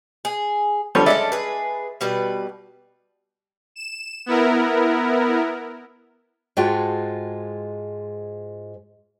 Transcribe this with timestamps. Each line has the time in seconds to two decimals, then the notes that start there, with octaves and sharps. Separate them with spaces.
0.25 G#4
0.95 D3 F3 G3 C#5
1.06 G#3 C#4 D4 A4 D5 E5
1.32 G#4 B4
2.01 B2 G3 B4
3.76 E7
4.26 B3 E4 A#4
6.57 G#2 G#3 F4 F#4 A4 G5